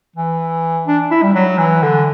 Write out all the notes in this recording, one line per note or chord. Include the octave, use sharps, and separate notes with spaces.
E3
D4
E4
G3
F#3
E3
D3